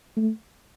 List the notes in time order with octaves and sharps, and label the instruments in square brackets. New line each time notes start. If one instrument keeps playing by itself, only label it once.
[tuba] A3